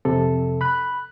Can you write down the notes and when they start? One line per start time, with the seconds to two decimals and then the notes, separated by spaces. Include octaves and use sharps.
0.05 F2 C3 A4
0.61 B5 F#6